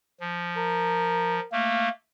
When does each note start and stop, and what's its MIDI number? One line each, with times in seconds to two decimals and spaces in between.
0.20 1.40 53
0.57 1.45 70
1.52 1.89 57
1.52 1.89 58
1.52 1.90 77